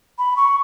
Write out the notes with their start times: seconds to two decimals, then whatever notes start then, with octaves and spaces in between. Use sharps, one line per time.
0.19 B5
0.37 C#6